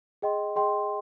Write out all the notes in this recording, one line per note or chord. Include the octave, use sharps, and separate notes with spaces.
G#4 D#5 G5 C6
G#4 D#5 G5 C6